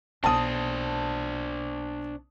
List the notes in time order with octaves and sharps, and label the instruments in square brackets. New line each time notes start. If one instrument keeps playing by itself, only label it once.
[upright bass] B1 B3 [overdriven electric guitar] D4 C5 [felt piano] A5 D#6